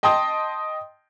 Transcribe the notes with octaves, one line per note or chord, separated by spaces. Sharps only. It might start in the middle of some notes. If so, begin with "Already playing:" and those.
D#5 G5 A5 C6 D#6